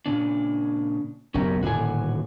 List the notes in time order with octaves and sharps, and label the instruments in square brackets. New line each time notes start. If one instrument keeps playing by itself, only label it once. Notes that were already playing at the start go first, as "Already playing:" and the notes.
[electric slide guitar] A#2 C#3 D4
[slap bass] F#1 B1 [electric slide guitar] C#4 G4 A#4
[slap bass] D#1 A2 D3 [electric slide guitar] F#4 G#5